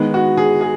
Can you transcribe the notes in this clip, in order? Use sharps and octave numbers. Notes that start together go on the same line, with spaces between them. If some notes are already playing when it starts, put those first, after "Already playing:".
Already playing: D#3 G#3 B3
F#4
G#4
G#4